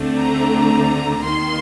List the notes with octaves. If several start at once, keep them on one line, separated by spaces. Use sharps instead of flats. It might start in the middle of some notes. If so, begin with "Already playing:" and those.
Already playing: D2 D3 A3 C4
A#5
D#2 D#3 A#3 C6